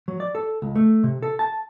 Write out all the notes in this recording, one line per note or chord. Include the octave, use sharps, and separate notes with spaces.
F#3
D5
A4
C#2
A3
C3
A4
A5